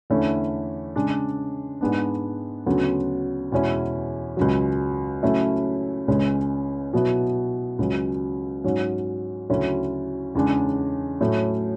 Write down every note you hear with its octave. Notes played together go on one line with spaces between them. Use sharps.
E2 D3 A3 C#4 E4
C#3 G#3 D4
G#2 G#3 B3 D4
D2 C#3 F#3 B3
E2 B2 G#3 C#4 E4
C#2 C#3 F#3
C#3 F#3 A3 C#4 E4
C#2 C#3 G#3 C#4
B2 F#3 B3 E4
C#2 C#3 F#3
G#2 F#3 C#4
D2 C#3 F#3 C#4 E4
E2 C#3 G#3 D4
A2 F#3 A3 C#4